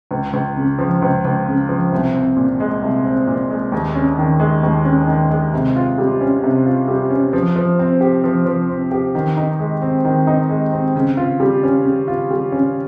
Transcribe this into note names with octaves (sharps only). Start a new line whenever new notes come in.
C#2
C#2
C#3
F3
C#2
C#2
C#3
F3
C2
C4
A#2
G#3
C2
C4
A#2
G#3
D#2
C#4
D#3
G#3
D#2
C#4
D#3
G#3
C3
F4
G3
C#4
C3
F4
G3
C#4
F3
F3
C4
G4
F3
F3
C4
G4
D#3
D#4
G#3
C4
D#3
D#4
G#3
C4
C#3
F4
G3
C#4
C#3
F4
G3
C#4